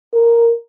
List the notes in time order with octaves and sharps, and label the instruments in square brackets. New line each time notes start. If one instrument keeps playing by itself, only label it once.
[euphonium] A#4